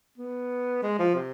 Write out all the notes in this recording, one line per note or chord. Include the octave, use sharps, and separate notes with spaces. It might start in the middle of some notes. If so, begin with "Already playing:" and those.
B3
G#3
F3
C3